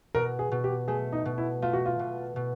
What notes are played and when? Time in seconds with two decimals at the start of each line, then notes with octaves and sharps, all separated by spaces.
0.15 B2 A#4
0.39 G#4
0.51 B2
0.64 G4
0.88 A3 G#4
1.13 D#4
1.25 B2
1.38 E4
1.62 A3 F4
1.73 F#4
1.86 F4
1.99 B2
2.36 B2